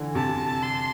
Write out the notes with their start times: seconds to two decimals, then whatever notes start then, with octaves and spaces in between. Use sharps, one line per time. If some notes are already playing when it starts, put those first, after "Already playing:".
Already playing: D3 E3
0.15 C3 A5
0.62 C6